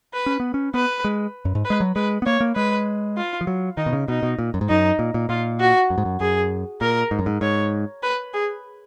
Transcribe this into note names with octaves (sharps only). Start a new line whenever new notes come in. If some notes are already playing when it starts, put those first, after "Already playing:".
B4
C#4
B3
C#4
B3 B4
G#3
F#2
G#2
B4
G#3
F#3
G#3 B4
B3
A#3 C#5
A#3
G#3 B4
F4
F3
F#3
D#3 D#4
B2
C#3
B2 D#4
B2
A#2
F#2
G#2
F#2 D#4
A#2
A#2
A#2 F4
F#4
F#2
G#2
F#2
F#2 G#4
A#2 A#4
G#2
F#2
G#2
G#2 C#5
B4
G#4